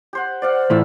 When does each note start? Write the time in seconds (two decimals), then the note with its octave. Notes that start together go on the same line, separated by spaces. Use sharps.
0.13 G4 C5 F#5
0.42 C5 D5 F5 F#5
0.70 A2 E3 A3 F4 F5 E6